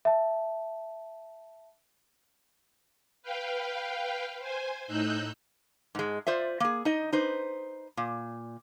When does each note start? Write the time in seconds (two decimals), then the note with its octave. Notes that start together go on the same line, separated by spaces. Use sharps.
0.05 E5 A5
3.22 B4 F5 G5
4.39 C5 G#5
4.87 A2 D#4 E6 F#6 G6
5.95 G#2 G#3
6.27 F4 C5 D5 E5
6.60 A#3 G#4
6.85 D#4 D#5
7.12 D#4 B4 C5
7.97 A#2